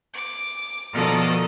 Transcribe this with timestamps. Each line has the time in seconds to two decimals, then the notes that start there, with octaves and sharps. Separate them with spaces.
0.13 D6
0.93 B2 D#3 F3 A4 D5 D#6